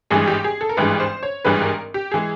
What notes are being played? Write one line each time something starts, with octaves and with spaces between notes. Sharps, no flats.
G#1 G2 E3 G#3 G#4
G4
G#4
A4
A#4
G#1 G2 E3 G#3 B4
C5
C#5
G#1 G2 E3 G#3 B4
A#4
G4
E3 G#3 G#4